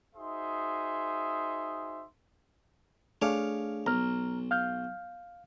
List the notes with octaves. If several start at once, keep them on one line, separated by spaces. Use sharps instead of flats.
D#4 F#4 G#4 C5 E5 C6
A3 D4 G#4 C#5 F5 D6
B1 A#5 F6
F5 F6 G6